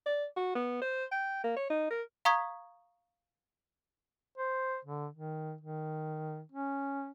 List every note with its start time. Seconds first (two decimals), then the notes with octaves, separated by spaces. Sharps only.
0.06 D5
0.37 F#4
0.55 B3
0.82 C5
1.12 G5
1.44 A#3
1.57 C#5
1.70 D#4
1.91 A#4
2.25 F5 A#5 C#6 D#6 G#6 B6
4.38 C5
4.85 D3
5.14 D#3
5.61 D#3
6.52 C#4